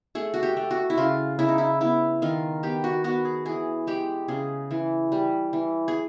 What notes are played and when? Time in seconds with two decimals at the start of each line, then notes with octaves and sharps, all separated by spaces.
0.15 A3 G#4
0.34 F#4
0.43 G4
0.57 A3
0.71 F#4
0.90 E4
0.97 C#3 F4
1.39 C#3 E4
1.49 D#4
1.58 E4
1.81 B3 E4
2.22 D#3 F4
2.63 B3 G4
2.84 F#4
3.04 B3 F#4
3.25 G#4
3.46 E3 G#4
3.87 G#3 G4
4.28 C#3 G#4
4.71 E3
5.12 G3
5.53 E3
5.88 G#4